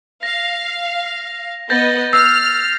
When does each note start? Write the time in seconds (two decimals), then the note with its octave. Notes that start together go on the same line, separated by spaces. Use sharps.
0.23 F5 A#6 F7
1.70 B3 D#5 G6 A6 A#6
2.13 E6 F6 C7